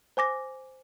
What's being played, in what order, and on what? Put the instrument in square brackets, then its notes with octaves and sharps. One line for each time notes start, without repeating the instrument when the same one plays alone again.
[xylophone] C5 G#5 D6 A#6